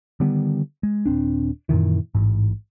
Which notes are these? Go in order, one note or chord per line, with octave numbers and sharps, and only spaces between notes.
D3 D#3 G3 B3
G#3
D#1 G#1 C4 D4
F#2 A#2 D#3 E3
A1 G#2